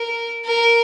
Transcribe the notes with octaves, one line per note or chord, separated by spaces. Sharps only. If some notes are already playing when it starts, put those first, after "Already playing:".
Already playing: A#4
A#4